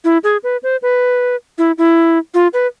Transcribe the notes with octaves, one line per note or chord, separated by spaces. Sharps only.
E4
G#4
B4
C5
B4
E4
E4
F4
B4